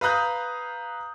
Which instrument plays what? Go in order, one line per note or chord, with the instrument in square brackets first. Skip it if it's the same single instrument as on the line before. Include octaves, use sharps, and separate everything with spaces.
[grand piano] B4 F5 A#5 D#6 F#6 G6